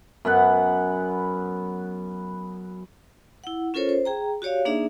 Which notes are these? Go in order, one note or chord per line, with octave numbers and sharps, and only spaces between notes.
F#2 B3 B4 F#5
E4 F#5
C#4 F4 A4 A#4 C5 C#5
C5
G#4 G5 A#5
F#4 G4 C#5 D5 F5
A#3 D4 D#4 G#4 D5 E5